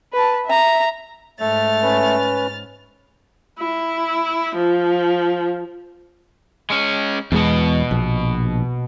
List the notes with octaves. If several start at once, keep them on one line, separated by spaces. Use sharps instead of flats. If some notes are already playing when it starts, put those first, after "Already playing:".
B4 A5
E5 A#5
G#2 A3 F6 A6
C#4 B4
E4
F3
G#3 C#4
E2 B2 G#3 B3
A#1